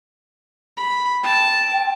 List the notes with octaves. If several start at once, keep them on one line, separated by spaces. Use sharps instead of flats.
B5
G5 A5